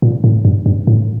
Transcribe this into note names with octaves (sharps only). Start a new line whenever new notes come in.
A#2
A2
G2
G2
A2